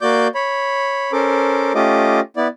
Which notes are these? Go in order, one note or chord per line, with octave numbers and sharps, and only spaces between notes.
A#3 F#4 D5 D6 G6
C#5 B5
C#4 A4 A#4 C5 D6
A3 C#4 F4 G4 D#5 D6
B3 E4 D5